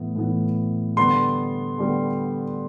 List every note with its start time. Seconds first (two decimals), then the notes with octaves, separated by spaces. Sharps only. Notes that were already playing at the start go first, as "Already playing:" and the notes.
Already playing: A2 E3 B3
0.16 A2 E3 B3
0.96 D3 G3 B3 C6
1.78 D3 G3 B3